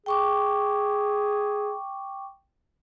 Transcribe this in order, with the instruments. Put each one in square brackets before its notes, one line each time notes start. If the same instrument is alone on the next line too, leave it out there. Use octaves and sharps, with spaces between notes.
[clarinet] G#4 [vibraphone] G5 C#6 D6